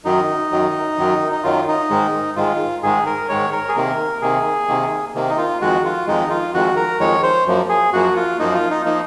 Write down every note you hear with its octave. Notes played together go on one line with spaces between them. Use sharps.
F#2 D#3 F#3 D#4
F#2 D#3 F#3
F#2 D#3 F#3
D#4
F#2 D#3 F#3 F4
D#4
G#2 D#3 G#3
G#2 D#3 G#3 F4
G#2 D#3 G#3 G#4
A#4
G#2 D#3 G#3 C#5
A#4
G#4
C3 D#3 A#3 A#4
C3 D#3 A#3 G#4
C3 D#3 A#3
C3 D#3 A#3
D#4
F4
F2 D#3 G#3 F#4
F4
F2 D#3 G#3 D#4
F4
F2 D#3 G#3 F#4
A#4
F2 D#3 G#3 C#5
C5
F#2 F3 A#3
G#4
F#2 F3 A#3 F#4
F4
F#2 F3 A#3 D#4
F4
D#4
F3 A#3 D#4